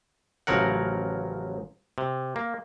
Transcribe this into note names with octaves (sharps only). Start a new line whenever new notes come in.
A1 C#3 F3 F#3 A#4 F#5
C3
A#3